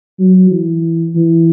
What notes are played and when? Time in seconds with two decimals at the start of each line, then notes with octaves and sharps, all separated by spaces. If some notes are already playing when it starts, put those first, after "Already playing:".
0.20 F#3
0.51 E3
1.15 E3